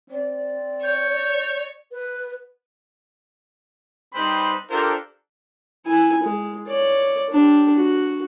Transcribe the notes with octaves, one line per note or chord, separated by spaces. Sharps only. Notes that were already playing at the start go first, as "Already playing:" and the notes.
C4 D5
C#5 G6
B4
G3 C4 D#4 B4 C5 B5
D4 F4 G4 A4 A#4 C5
E4 G#5
G#3
C#5 D5
D4 G4
F#4